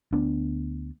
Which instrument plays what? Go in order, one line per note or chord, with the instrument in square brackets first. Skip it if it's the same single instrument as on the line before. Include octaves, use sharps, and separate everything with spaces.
[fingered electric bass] D2 B3 D4